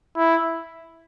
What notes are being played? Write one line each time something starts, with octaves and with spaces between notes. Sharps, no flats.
E4